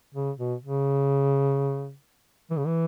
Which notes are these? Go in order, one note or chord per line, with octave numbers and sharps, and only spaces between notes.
C#3
B2
C#3
E3
C#3
E3